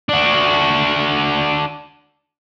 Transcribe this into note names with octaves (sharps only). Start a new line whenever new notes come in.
D4 F#4